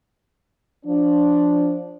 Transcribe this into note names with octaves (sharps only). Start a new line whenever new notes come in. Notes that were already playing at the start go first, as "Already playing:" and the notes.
F3 D4